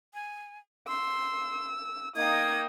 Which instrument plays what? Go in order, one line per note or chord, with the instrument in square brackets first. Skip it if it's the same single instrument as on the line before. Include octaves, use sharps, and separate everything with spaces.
[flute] G#5
[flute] C6 [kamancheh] E6
[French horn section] A#3 D#4 [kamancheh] G5 D#6 [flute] G#6